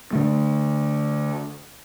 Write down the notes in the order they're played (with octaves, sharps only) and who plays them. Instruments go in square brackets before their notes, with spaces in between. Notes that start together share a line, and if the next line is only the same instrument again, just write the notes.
[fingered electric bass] D3 A3